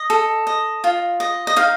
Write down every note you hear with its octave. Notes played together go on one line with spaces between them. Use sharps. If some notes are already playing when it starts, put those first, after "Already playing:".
Already playing: D#5
A4
D#5
F4
D#5
D#5
D#4 F5